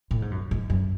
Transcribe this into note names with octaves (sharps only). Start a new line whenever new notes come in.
A2
G#2
F#2
G#2
F#2